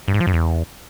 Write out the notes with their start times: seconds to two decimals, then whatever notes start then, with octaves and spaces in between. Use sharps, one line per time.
0.08 G2
0.14 G#2
0.20 F3
0.27 F#2
0.33 E2